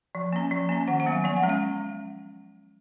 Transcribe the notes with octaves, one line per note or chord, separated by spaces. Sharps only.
F3
A#3 C#4
F3
A#3 C#4
D#3 F#5
F#5
F#3 B3
F5
F3 G#5
F#5
G#3 C#4
F5